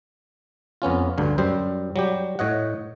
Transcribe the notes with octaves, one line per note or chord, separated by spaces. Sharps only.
F2 B3 C#4 F4
D2 G2 D3
F#2 G3 C5
F#3 G3 G4
A2 C#5 D#5 F#5